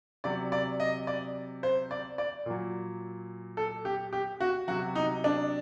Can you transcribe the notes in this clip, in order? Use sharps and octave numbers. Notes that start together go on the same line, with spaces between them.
C3 F#3 D5
D5
D#5
D5
C5
D5
D5
A#2 F#3
A4
G4
G4
F#4
C3 F#3 F#4
D#4
D4